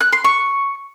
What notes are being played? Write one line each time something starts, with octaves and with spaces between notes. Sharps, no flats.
F#6
C6
C#6